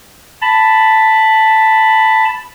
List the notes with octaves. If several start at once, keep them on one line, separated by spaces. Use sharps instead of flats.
A5 B5